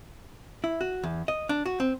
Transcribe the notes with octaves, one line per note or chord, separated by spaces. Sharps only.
E4
F#4
E2
D#5
D4
F#4
C4